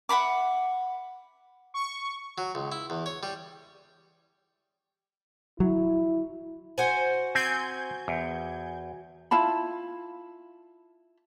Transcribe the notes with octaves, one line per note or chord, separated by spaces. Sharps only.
E5 F#5 B5 D6
C#6
F#3
C#2
E4
E2
C#5
G3
F#3 E4
F#4 C5 G#5
C4 G#5 G6 G#6
E2
E4 F4 A5 B5